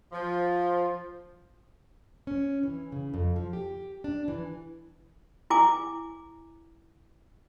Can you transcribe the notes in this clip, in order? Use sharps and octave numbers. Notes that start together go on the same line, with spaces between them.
F3
C#4
E3
C#3
F2
F3
G4
D4
E3
E4 G#5 D6